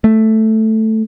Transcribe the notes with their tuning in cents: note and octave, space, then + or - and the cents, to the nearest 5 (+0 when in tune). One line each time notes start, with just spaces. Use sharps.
A3 +0